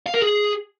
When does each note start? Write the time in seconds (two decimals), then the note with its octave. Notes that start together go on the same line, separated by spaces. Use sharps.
0.06 F5
0.14 A#4
0.22 G#4